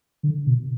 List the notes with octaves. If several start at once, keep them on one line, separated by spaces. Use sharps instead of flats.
D3
B2